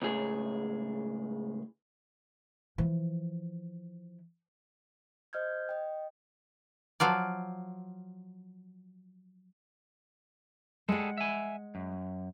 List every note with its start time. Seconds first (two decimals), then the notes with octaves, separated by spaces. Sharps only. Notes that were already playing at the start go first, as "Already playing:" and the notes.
0.02 C#2 A2 G#4
2.78 E3 F3
5.33 C5 D#5 F6 G6 G#6
5.69 D#5 G5
7.00 F3 F#3 F4 D5
10.89 G3 G#3 G#4 A4 F#5
11.18 E5 G#5
11.75 F#2